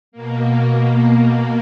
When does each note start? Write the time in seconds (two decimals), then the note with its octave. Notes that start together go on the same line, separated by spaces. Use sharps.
0.12 B2 A#3